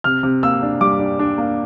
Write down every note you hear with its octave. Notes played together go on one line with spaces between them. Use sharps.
C3 F6
C3
A#3 E6
D4
G3 D6
D4
D4
A#3